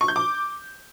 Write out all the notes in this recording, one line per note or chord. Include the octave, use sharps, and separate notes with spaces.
C#6
G6
D6